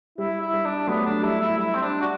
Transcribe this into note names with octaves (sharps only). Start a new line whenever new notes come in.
G3 E4
E4
G3
D4
F#3 A3 B3
D4
G3 E4
E4
G3 E4
C4
D4
F#4